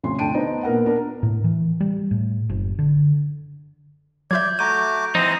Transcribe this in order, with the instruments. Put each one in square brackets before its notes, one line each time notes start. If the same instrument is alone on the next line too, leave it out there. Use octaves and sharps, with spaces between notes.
[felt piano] D2 C3 F3 C#4 C6
D2 D4 G5 A5 D7 D#7
B3 D4 D#4 C5
A#2 B3 A#4 F#5
D4 A#4
[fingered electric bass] A2
E3
G3
A2
F#1
D3
[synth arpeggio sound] F#3 F4 E5 [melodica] D5 [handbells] G6 G#6
[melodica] A3 F#4 D6 [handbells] A#5 G6 [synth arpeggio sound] D#7
[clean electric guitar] E3 C4 D#4 [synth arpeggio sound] F3 [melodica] C5 D#5